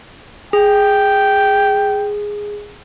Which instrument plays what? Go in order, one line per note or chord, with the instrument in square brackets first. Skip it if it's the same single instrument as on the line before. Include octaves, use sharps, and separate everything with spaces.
[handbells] G#4 [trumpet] G5